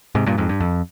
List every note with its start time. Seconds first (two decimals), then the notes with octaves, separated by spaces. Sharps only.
0.15 G#2 C3
0.26 G2 A#2
0.38 F2 G#2
0.49 G2
0.60 F2